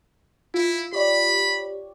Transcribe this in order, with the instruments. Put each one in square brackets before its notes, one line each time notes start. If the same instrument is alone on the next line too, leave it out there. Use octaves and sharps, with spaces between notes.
[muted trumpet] E4 [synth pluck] F4
[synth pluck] G4 C#5 D5 [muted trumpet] B5